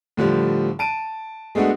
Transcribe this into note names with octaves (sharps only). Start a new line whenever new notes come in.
A2 D3 F3 G3
A5 D7 D#7
G#3 A3 B3 D4 F#4